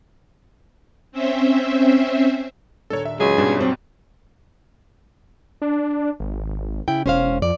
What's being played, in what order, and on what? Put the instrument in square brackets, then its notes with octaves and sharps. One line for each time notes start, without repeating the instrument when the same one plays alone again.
[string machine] C4 C#4 C5 E5
[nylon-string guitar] D#2 A#2 D4 [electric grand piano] A4 C#5
[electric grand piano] E5
[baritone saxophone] C#2 [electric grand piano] F#3 [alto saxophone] G#4
[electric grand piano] G#2 B2 G3 [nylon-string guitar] C#4 D4
[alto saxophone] F#3 [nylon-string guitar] C4 D4 C5
[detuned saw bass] D4
G#1
[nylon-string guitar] C#3 E4 G5
[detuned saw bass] E1 [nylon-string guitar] C#4 C5 F5
[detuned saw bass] F2 [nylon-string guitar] D5